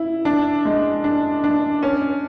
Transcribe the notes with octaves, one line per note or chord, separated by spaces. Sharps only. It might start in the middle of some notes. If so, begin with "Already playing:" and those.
Already playing: E4
D4
G#3
D4
D4
C#4